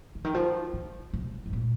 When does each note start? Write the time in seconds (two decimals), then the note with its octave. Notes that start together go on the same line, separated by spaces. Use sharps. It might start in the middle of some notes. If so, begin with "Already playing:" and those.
0.15 C#3
0.25 D#3
0.34 F3
0.73 D#3
1.13 C3
1.46 G#2
1.53 A#2